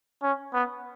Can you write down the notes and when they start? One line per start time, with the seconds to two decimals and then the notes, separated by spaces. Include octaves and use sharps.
0.23 C#4
0.54 B3